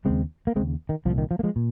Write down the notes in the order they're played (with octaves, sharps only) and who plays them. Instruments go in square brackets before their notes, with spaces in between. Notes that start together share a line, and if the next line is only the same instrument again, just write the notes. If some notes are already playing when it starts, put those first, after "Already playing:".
[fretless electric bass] D#2 C#3 G#3 C4
A#3
C#3 G#3 C4
D#2
D#3
C2 F3
A#2
D#3
F3
A#3
F3 G#3
A#2